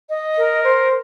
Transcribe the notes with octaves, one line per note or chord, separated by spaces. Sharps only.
D#5
A#4
C5